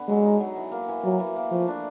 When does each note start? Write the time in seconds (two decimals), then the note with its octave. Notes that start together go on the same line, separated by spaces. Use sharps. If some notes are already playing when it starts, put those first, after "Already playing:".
Already playing: D3 B3
0.08 F#3 G#3
0.24 D#4
0.40 F#3
0.57 E3
0.72 A#3
0.88 E3
1.04 E3 F#3
1.19 E3
1.36 A#3
1.51 F3 A3
1.68 D4